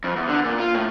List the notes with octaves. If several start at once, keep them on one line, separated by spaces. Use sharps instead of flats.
F2
E2
D3
A#2
F4
A2